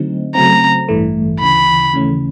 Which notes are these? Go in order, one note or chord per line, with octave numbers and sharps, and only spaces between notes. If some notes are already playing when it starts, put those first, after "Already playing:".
Already playing: D3 F#3 A3 C4 D#4
C#3 F#3 A3 C4 A#5
A1 G2 E3 A3
D2 C#3 E3 B5
D#2 C#3 E3 A3 C#4